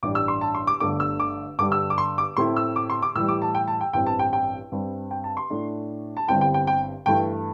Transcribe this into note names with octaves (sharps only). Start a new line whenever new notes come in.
A1 G2 G3 D4 D6
E6
C6
A5
C6
D6
G1 G2 D3 A3 D4 D6
E6
D6
G2 D3 G3 D4 D6
E6
D6
C6
D6
A2 A3 C4 E4 C6
E6
D6
C6
D6
A2 E3 G3 E6
D6
A5
G5
A5
G5
A1 G2 E3 G3 C4 G5
A5
G5
G5
G2 G3 C4
G5
A5
C6
A2 A3 D4
A5
G1 G2 G3 C4 E4 G5
G5
G5
G5
G2 E3 A3 E4 G5